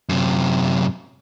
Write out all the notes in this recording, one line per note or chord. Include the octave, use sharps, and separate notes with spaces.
F#2 C3